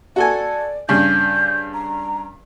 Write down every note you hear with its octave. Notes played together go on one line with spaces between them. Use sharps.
F#4 A4 D5 G#5
G2 C#3 G6
A#5